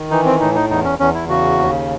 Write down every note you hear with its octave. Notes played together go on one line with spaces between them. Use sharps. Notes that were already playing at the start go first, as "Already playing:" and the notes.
Already playing: D#3
E3 D#4
C4
A2 D#4
D#4
E2 D#4
C#4
E2 C#4
E4
C#3 F#4
D#2